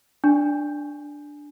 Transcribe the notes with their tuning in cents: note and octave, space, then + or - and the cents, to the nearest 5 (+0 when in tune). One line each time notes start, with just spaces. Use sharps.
D4 +0 G#5 +0